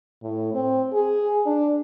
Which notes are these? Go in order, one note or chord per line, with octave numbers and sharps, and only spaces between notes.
A2
C4
G#4
D4